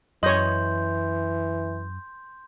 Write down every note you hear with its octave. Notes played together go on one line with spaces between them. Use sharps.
F#2 E3 C#5 D#5 C6 G6